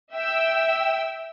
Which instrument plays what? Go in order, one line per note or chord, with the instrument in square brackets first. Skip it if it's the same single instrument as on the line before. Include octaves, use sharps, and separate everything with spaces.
[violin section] E5 G5 E6